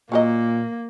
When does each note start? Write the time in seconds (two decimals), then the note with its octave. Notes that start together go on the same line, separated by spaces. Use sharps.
0.12 A#2 F#3 A#3 G#4 D#5